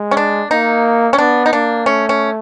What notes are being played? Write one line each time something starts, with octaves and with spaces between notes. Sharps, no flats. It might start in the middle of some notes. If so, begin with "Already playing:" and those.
Already playing: G#3
C#4
D4
A#3 D#4
C#4
B3 D4
D#4
A#3 D4
A3 C#4
C#4